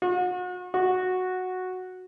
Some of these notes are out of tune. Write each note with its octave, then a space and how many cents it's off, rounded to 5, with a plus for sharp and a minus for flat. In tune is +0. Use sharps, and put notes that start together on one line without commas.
F#4 -40
F#4 -5